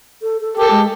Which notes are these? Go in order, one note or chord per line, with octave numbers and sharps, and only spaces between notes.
A4
A4
G4 A4 A#4
G#3